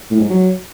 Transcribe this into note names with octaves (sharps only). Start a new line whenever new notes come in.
A2
G#2
F#3